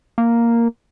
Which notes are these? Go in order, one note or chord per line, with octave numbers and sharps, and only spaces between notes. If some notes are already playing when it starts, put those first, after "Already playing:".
A#3